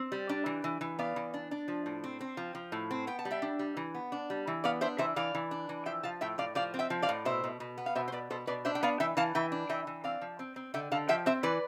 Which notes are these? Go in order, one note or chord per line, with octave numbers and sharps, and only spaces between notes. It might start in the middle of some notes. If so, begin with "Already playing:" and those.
Already playing: C4
G3
D4
E3
E3
E3
B3 D5 F5
E3
D4
D4
F3
A2
C4
C4
F3
F3
A2
C4
B3 G5
A5
G3
E5 G5
D4
G3
E3
B3
D4
G3
E3
B3 D5 F5
D4 C5 E5
E3 C5 E5
E3 D5 F5
E3
D4
E3
F3 E5 G5
F3 F5 A5
A2 E5 G5
A2 D5 F5
F3 D5 F5
C4
E5 G5
F3
D5 F5
A2
B2 C5 E5
B2
B2
B3
F5
B2 C5 E5
C5
B2 B4 D5
B2 A4 C5
B2 B4 D5
D4 C5 E5
G5
B3 D5 F5
E3 E5 G5
E3 F5 A5
E3 E5 G5
D4
E3 E5 G5
E3
C4 D5 F5
F3
C4
C4
D3 E5 G5
D3 F5 A5
F3 E5 G5
C4 C5 E5
E3 B4 D5